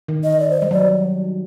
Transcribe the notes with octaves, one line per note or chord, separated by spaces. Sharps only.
D#3
D#5
D5
C5
G3 D#5
F#3 D5